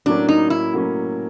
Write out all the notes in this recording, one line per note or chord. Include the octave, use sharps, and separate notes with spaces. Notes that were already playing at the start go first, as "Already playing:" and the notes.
A2 F#3 A#3 C#4 D4
D#4
E4
A2 F#3 A#3 C#4